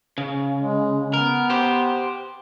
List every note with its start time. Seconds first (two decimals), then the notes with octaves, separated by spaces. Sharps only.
0.18 C#3
0.56 G#3
1.14 B3 A#4
1.50 G4 C5